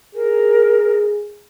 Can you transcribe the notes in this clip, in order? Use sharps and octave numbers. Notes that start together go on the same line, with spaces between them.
G#4 A#4